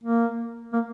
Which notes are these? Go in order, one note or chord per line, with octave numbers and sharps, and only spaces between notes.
A#3
A#3